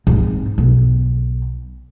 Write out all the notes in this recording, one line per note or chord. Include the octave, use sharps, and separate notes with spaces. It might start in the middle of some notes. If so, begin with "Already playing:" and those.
G#2 C4
B1